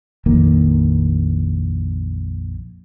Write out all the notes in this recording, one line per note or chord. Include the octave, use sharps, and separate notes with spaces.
A#1 F2 D#3 A#3